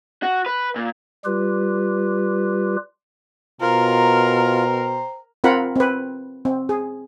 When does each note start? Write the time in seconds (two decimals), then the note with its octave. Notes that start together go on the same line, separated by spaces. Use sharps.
0.23 F#4
0.46 B4
0.76 A#2
1.25 G3 F4 G4 B4
3.61 B2 F4 A#4 C5 G5 A#5
5.44 C4 F4 A#4 F#5 B5
5.76 C4 B4
6.45 C4
6.69 G#4